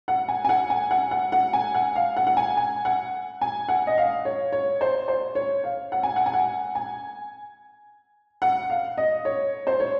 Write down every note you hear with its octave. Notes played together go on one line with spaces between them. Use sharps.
F#5
G#5
G#5
F#5
G#5
F#5
F#5
F#5
G#5
F#5
F5
F#5
F#5
G#5
G#5
F#5
G#5
F#5
D#5
F5
C#5
C#5
C5
C5
C#5
F5
F#5
G#5
F#5
G#5
F#5
G#5
F#5
F5
D#5
C#5
C5
C#5